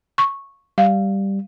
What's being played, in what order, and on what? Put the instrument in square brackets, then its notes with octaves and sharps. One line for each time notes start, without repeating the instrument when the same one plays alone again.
[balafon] C#6
[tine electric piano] G3 [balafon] F5